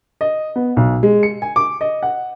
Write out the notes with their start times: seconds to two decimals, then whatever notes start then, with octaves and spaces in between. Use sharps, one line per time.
0.21 D#5
0.56 B3
0.77 B1
1.03 G#3
1.23 C#7
1.42 G#5
1.56 D6
1.81 D#5
2.03 F#5